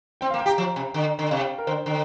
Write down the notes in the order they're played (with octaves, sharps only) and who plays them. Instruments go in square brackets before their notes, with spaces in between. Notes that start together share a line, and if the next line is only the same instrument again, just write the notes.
[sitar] C4 [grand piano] G5
[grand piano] F5
[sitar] A#3
[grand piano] G5
[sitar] G4
[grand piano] A#5
[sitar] F3
C3
D3
D3
[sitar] C3 [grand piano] F5
[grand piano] G5
A#4
[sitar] D3 [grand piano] C5
[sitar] D3